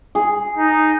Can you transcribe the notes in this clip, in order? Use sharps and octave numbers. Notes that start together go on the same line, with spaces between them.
G#4
D#4